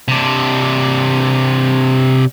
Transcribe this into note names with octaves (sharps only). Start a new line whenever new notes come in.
C3 D4